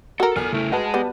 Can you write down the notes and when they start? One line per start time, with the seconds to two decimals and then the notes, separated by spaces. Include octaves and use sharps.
0.20 F#4 A4 A#4
0.36 E2 A4 G#5 F6
0.53 C#3 A3 E4
0.72 F#4 G#4 B4 D#5 A5
0.94 G3 B3